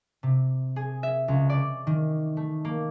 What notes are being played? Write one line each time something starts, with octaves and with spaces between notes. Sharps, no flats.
C3
G#4
E5
C#2
D5
D#3
A3
A#3